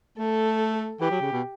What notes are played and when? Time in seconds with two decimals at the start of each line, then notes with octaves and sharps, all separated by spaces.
0.18 A3 A4
1.01 E3 G4
1.11 F#3
1.21 C#3
1.32 B2